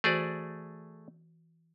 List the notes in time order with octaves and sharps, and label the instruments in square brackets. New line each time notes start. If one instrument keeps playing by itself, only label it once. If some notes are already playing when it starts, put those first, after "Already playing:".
[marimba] E3 F#4 C5 [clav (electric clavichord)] A3 G#4 D5